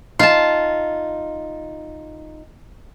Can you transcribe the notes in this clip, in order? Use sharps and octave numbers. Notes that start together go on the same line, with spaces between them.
D#4 F4 A5